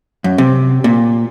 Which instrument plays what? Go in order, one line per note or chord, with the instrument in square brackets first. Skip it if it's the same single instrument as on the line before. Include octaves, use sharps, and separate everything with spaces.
[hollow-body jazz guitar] F#2
C3
A#2